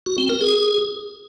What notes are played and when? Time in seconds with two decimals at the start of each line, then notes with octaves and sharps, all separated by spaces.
0.06 F#4
0.18 C4
0.29 A#4
0.41 G#4